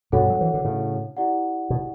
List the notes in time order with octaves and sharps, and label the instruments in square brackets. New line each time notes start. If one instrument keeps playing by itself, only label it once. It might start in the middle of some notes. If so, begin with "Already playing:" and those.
[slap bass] G2 B2 [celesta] D4 F#4 A4 C#5 F#5
[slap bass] F#3
E3
D3
A2 C#3
[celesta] E4 G4 D5 F#5
[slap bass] B2